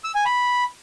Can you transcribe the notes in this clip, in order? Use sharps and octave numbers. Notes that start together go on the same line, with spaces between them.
E6
G#5
B5